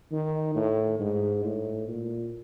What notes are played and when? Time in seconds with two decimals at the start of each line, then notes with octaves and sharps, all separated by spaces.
0.12 D#3
0.55 A2
1.00 G#2
1.44 A2
1.88 A#2